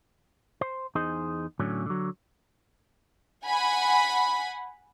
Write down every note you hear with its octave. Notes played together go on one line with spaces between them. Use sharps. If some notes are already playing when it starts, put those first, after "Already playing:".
C5
E2 D#4 G#4 C5 D#5
A2 D3 F#3 C#4
D3 F#3
F#5 G#5 B5